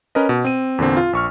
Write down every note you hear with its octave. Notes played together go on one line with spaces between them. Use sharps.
C#4 A#4 B4 D#5
B2
C4 D#7
E2 A#2 D3 C4
F4
A#1 C#6 F6